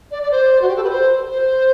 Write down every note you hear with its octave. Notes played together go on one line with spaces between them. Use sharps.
D5
D5
C5
F#4
G4
A4
B4
C5
C5